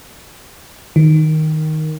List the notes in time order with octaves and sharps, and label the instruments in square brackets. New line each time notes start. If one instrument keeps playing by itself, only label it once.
[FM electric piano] D#3